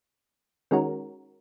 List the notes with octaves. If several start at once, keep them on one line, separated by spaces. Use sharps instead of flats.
D#3 G#3 C#4 F#4 A#4